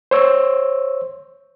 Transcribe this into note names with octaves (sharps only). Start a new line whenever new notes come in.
C5 C#5 E6